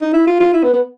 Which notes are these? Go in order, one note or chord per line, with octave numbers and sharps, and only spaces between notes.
D#4
E4
F4
F4
E4
B3
B3